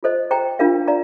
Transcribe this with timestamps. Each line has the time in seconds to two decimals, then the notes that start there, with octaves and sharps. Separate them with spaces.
0.03 F4 A4 C5 D#5
0.31 C5 G5 A#5
0.59 D4 F4 A#4 F5
0.88 D5 F5 A#5